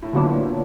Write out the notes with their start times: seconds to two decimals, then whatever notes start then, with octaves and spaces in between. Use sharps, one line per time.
0.02 A2
0.13 A#2 D3 F#3 B3 D4
0.24 A2
0.28 A#2
0.43 A2